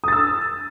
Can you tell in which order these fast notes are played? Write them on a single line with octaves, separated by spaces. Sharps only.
D#6 A6 E6